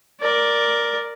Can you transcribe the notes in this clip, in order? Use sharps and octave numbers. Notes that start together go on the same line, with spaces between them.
A#4 D5